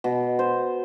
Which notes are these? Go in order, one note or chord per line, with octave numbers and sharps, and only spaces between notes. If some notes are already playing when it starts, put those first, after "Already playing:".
B2
C5